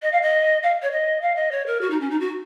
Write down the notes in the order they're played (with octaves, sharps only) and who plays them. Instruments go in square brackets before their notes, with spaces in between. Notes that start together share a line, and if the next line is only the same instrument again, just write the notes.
[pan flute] D#5
F5
D#5
F5
C#5
D#5
F5
D#5
C#5
A#4
F#4
D#4
C#4
D#4
F#4